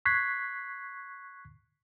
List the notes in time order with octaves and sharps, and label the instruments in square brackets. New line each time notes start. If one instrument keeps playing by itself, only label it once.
[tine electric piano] C#6 F#6 G#6 B6 C7